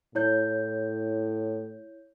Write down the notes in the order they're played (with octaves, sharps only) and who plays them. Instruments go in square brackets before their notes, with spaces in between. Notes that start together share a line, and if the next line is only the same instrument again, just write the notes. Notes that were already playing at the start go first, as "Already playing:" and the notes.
[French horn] A2 [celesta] E4 C#5 G6